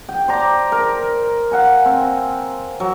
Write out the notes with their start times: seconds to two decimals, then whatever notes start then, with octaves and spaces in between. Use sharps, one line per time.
0.09 G5
0.28 C5 D5 A#5
0.72 A#4
1.51 F5 F#5 G#5
1.86 C4
2.80 F#3